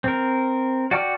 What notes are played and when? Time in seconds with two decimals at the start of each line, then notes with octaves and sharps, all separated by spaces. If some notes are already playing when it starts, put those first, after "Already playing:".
0.04 C4 A#4
0.91 F#4 D5 G5 A5 F6